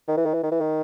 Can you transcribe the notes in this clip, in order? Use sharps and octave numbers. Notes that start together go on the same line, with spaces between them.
D#3
E3
D#3
E3
D#3
E3
D#3